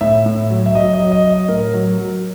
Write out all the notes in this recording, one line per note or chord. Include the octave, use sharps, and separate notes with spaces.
A2 E5
A2
F#3
E5
F#3 D#5
D#5
F#3
D#5
F#3
D#5
A2 A#4
F#3
F#3